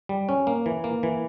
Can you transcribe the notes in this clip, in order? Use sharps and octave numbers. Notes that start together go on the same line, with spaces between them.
G3
C#4
A#3
E3
A#3
E3